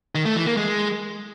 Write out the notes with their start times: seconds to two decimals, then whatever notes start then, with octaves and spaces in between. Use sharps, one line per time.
0.15 D#3
0.26 A3
0.36 E3
0.46 A#3
0.57 G#3